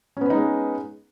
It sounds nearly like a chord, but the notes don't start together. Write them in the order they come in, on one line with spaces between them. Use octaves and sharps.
C#4 B3 B4 D#4 G#3